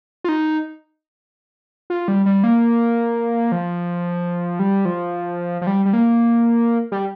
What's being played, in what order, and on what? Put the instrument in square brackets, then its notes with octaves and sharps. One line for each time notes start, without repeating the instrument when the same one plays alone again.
[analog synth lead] F4
D#4
F4
G3
G3
A#3
F3
G3
F3
F3
G3
G3
A#3
G3